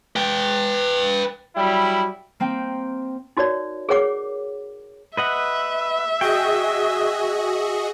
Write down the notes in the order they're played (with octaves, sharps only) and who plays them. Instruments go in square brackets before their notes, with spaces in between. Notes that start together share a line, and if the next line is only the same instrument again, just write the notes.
[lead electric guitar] B4 G5
[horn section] F#3 G3 E4
[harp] A#3 C4 G5
[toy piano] D#4 F#4 A#4 C#5 D5
G#4 A#4 C#5 F#5 D6
[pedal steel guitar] B4 D#5 F#5 [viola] E5
[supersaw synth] F#4 G#4 D#5 [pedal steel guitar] G5